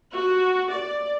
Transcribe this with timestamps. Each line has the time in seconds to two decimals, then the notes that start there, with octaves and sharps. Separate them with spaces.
0.14 F#4
0.73 D5